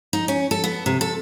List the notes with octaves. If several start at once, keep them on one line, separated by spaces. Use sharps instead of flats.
D#4
C#4
A4
B3
C3
A4